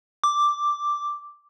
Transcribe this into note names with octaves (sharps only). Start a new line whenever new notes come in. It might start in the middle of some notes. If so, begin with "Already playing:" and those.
D6